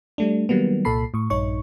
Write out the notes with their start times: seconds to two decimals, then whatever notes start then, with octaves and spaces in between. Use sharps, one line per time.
0.18 G3 A3 D4
0.49 D#3 F#3 G3 A#3 B3
0.85 C2 A#2 A4 A5 B5 C7
1.14 A2 C#6
1.30 A#1 G2 D#4 C#5 C#6